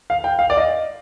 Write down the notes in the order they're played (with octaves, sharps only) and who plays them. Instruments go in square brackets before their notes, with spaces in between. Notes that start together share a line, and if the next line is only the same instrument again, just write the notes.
[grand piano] F5
G5
F5
D5
D#5